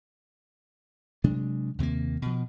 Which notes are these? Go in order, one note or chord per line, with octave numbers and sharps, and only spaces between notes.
C3 F#3 G#3 D4
D#2 C3 G3 A#3
B2 F3